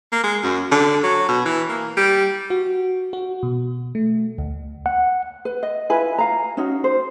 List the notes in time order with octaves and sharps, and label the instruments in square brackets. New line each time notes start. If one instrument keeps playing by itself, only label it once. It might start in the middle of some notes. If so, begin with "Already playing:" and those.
[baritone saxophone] A#3
G#3
F#2
D3
F#3
B2
E3
A#3
G3
[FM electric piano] F#4
F#4
B2
A3
D2
[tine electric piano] F#5
[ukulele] B4
D#5
E4 F4 B4 G#5
F5 A#5
C#4 D#4 F#4
C5